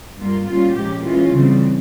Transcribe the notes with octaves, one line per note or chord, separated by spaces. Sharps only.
G2 G3 A#3 F4
A#2 G3 C#4 F4
A#2 F3 G#3 C#4 G4
E3 G#3 C#4 F4
C#3 E3 G3 C4